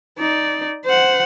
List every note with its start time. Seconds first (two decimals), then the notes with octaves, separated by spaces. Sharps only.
0.18 D#4 D5
0.85 C5 F#5